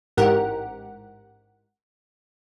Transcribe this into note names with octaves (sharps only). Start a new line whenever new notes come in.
A1 G#2 G4 A#4 F#5